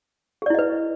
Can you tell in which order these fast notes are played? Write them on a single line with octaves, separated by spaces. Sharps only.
G#4 D5 E4 D#5 B4